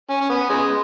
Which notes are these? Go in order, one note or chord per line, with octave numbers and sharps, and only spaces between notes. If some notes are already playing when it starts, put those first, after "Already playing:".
C#4
C#4
B3
C#3 G#3